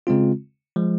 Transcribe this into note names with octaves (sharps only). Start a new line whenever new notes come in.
C#3 G#3 C4 F4
F3 G#3